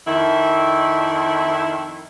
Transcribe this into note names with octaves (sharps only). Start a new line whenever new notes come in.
F2 D#3 E4